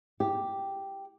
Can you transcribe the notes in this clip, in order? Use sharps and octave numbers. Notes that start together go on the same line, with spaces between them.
G4